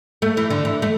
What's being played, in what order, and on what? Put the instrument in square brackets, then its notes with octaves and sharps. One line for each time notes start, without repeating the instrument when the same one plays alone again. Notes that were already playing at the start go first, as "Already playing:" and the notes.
[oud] A3
E3
D3
E3
A3